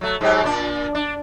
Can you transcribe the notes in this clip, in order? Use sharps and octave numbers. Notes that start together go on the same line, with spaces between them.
F#3 A3
G#2 F#3 G4
A#2 D4
D4